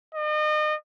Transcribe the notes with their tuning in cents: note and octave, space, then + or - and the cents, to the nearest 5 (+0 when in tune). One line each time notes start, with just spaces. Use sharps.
D#5 -35